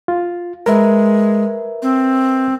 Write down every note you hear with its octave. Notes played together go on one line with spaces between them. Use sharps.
F4
G#3 A#4 B4 E5
C4